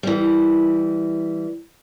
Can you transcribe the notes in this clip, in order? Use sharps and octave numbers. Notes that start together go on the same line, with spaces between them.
E3 G3